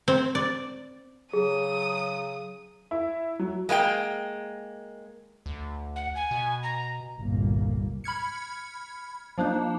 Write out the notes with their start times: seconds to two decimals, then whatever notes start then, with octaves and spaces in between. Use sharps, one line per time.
0.08 C4
0.35 D5
1.33 C#3 F#3 G#4 D#6
2.91 E4
3.39 F#3
3.69 G#3 A#3 E4 G5
5.46 D2
5.96 F#5
6.15 G#5
6.31 B2
6.63 A#5
7.19 G1 C2 A#2 A#3
8.04 B5 F6 G#6 C#7
9.38 F3 A#3 D4 D#4